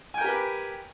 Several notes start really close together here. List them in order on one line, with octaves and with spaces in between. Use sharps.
G#5 G5 A#4 G4 B4